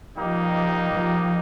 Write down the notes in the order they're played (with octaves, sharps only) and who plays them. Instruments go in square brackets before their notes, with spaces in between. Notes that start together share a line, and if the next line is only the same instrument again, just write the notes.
[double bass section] F3 [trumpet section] G3 A#3 D#4 G4 D#5
[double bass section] F3